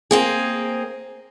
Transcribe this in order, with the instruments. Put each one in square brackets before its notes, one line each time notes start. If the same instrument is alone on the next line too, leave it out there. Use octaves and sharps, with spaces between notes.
[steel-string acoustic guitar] A#3 C4 G#4